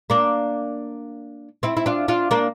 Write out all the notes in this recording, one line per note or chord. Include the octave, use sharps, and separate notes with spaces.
A#3 D4
C4 E4
E4
D4 F4
D4 F4
A#3 D4